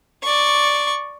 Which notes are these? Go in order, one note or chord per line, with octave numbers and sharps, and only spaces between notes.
D5 C#6